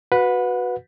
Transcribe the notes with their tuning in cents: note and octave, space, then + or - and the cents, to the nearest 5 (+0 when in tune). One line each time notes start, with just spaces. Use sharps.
F#4 +0 B4 +0 F#5 -30